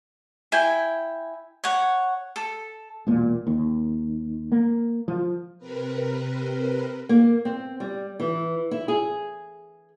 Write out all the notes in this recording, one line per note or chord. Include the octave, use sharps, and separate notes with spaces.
E4 G5 G#5
C#5 F#5
A4
E1 A#2
D#2
A#3
F3
C3 C4 A#4 B4
A#3
C4
G3
E3
E4
G#4